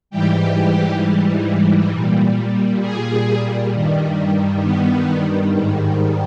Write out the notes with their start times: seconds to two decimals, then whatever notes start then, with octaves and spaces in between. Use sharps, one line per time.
0.10 G#2 E3 G3 G4
1.91 A#2 G3
2.82 G#4
3.72 G2 D#3 G3
4.63 B3
5.54 G#2 D#3 G3